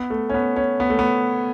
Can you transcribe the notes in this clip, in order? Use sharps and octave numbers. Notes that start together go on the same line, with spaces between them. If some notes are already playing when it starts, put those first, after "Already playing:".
Already playing: B3
A3
C#4
B3
C#4
B3
A3
B3